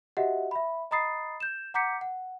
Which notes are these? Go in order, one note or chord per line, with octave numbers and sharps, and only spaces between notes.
F#4 G4 D#5 E5 F#5
E5 B5
D#5 A#5 B5 D#6 A6 C7
G6 E7
F#5 A#5 D6 G6 B6 C#7
F#5